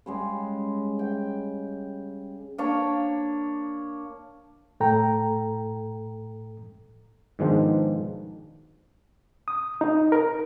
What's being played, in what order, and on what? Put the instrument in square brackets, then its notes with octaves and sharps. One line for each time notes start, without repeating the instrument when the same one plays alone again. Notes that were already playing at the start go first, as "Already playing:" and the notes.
[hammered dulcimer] C#3 G3 G#3
G5
A#3 D4 C#5
[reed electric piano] A2 A4 G5 A#5
[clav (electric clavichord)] G#2 B2 D#3 F3 G#3 D4
[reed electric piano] D#6
D#4
A#4